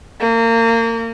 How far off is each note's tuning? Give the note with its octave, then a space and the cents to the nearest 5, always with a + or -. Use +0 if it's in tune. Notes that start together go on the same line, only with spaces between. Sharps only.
A#3 -30